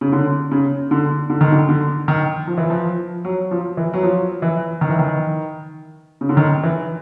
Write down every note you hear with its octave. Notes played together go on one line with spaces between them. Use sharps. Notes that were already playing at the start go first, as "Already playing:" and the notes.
C#3
D3
C#3
D3
D3
D#3
D3
D3
D#3
F3
E3
F3
F#3
F3
E3
F#3
F3
E3
D#3
E3
D#3
C#3
D3
D#3
E3